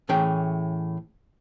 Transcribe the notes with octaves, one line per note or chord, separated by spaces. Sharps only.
A2 E3 C#4 G#4 G5